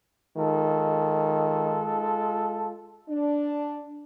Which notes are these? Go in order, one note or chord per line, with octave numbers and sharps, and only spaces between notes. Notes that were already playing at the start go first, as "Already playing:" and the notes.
D#3 G#3 F4 A4
D4